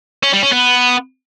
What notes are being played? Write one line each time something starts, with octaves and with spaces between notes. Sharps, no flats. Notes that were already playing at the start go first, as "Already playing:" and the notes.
C#4
G3
C#4
B3